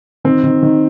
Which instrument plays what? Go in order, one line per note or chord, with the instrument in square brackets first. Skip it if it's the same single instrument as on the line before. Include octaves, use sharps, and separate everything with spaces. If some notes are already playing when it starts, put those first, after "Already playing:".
[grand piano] D#3 [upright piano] C4
[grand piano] D#3
D#3